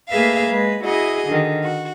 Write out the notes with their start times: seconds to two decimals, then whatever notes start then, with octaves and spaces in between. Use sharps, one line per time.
0.10 A3 A#3 G#4 B4 E5 F5
0.49 G#3 B4
0.82 E4 F#4 G#4 D#5
1.27 D3 D#3
1.63 F#4